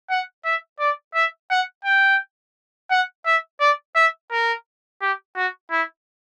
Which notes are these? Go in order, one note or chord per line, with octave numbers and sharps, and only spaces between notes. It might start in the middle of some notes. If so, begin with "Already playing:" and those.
F#5
E5
D5
E5
F#5
G5
F#5
E5
D5
E5
A#4
G4
F#4
E4